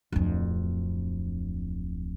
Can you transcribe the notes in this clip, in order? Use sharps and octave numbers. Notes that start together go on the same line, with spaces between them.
D1 F2